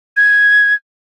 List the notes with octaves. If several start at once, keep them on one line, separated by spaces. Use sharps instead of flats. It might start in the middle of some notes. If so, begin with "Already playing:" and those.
G#6